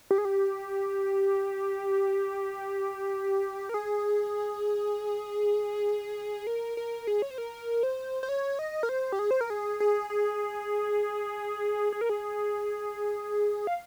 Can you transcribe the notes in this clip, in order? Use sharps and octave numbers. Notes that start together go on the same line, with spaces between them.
G4
G#4
G4
A#4
G#4
A#4
A#4
G#4
C#5
C5
A#4
C5
C5
C#5
D#5
A#4
C5
G4
G#4
C5
A#4
G#4
G#4
G#4
G#4
A#4
G#4
F5